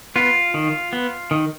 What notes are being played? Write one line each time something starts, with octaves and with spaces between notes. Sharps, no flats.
B3 F4
D#3
B3
D#3